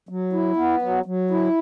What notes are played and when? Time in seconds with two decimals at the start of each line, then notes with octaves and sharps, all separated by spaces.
0.09 F#3
0.33 E4
0.56 B3
0.82 F#3
1.05 F#3
1.31 E4